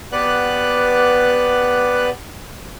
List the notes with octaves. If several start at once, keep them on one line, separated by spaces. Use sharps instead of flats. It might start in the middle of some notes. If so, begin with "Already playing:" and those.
B3 G4 B4 D5 F#5 F#6